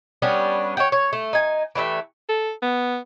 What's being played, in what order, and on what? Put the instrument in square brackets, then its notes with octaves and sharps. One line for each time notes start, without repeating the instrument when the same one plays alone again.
[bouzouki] G3 B3 C#4 D4
C#5 E5 F#5 G5
C#5
A3
D#4 G#5
E3 G3 A3 E5
[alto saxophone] A4
B3